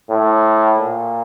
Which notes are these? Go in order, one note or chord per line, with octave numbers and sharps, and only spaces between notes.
A2
A#2